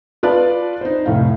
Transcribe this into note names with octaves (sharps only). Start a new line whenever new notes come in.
F4 B4 D5 A5
D#4 C5
F1 A2 F5